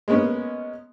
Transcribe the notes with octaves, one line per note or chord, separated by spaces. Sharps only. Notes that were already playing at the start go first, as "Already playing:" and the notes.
G#3 A#3 B3 C#4